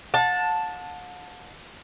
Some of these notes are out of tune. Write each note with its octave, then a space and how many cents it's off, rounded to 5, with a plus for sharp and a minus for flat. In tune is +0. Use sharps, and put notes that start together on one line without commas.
F#5 -40 A5 +0